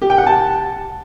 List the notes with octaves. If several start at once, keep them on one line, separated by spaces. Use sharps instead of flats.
G4
G5
F#5
A5